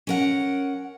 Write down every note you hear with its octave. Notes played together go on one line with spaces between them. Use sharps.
C#4 A#4 F#5